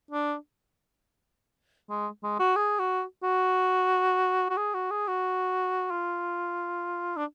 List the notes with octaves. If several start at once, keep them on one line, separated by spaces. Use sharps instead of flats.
D4
G#3
G#3
F#4
G#4
F#4
F#4
F#4
G#4
F#4
G#4
F#4
F4
D4